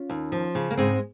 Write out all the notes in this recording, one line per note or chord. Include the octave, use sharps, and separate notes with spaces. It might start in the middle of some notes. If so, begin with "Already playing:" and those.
Already playing: C#4 F4
D#2
F3
C#3
A#3
G#2 G#3 C4